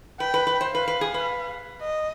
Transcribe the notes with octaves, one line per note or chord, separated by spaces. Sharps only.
B4 G5
B4
B4
C5
B4 F5
B4
G#4
B4
D#5